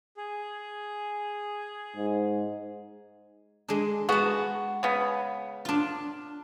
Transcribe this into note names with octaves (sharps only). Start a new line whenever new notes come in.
G#4
G#2
G#3 D4
G#3 B3 F#4 A5
C#3 B3
D4 F4